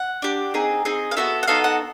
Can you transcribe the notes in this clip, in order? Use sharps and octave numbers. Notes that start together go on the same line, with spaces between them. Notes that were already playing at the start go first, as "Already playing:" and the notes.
Already playing: F#5
D4 G4
C4 D#4 G#4
C4 D#4 G#4
F5
B3 D#4 F#4 A4 E5
F#5
B3 D#4 F#4 A4 F5
F#5